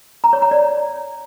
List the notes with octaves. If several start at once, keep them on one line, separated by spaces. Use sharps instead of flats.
A#5
C#5
A#5
D5